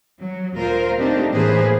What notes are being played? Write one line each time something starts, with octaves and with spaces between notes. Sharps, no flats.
F#3
D2 A#2 F4 A#4 C5
A3 A#3 C4 D4 D#4 G4
A2 E3 A#3 G#4 B4 C5